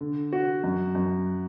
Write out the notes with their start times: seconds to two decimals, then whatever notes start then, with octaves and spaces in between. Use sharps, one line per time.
0.01 D3
0.33 F#4
0.64 F#2
0.95 F#2